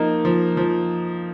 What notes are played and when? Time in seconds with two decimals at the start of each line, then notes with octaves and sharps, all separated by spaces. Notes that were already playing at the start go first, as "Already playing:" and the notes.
Already playing: F3 A#3 D#4
0.25 F3
0.57 F3